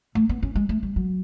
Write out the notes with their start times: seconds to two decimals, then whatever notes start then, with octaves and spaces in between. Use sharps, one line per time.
0.15 A3
0.29 B3
0.43 C#4
0.55 G#3
0.69 A3
0.83 G3
0.96 F#3